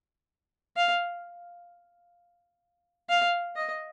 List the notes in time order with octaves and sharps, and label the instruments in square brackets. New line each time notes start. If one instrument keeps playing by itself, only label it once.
[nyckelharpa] F5
F5
D#5